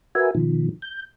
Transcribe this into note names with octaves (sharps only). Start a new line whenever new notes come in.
F#4 A#4 B4 E5 G#5
B2 D#3 F3
G6